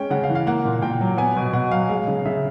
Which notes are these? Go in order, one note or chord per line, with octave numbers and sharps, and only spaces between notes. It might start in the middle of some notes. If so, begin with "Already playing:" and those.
Already playing: G#3 C#4 G5
C#3 F#5
F5
E3
F5
A#3 F#5
A#2
A#2 G5
F#3
B3 G#5
B2
B2 F#5
F#3 F5
G#3 F5
C#3
C#3 E5